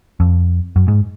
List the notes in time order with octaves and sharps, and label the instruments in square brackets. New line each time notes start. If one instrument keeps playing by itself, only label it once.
[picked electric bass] F2
F#2
G#2